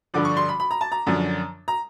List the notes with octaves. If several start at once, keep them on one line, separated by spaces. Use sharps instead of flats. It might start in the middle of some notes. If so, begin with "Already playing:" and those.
G2 D3 F3 D6
C#6
C6
B5
B5
A#5
A5
A#5
F#2 D3 F3
A#5